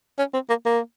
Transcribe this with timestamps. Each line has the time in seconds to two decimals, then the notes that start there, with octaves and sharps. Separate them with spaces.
0.19 C#4
0.34 C4
0.49 A#3
0.65 A#3